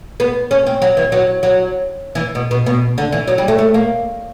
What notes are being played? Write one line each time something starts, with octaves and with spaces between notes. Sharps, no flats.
B3
C#4
C4
F#3
E3
F#3
F#3
E3
B2
B2
B2
D3
E3
F#3
G3
A3
A3
A#3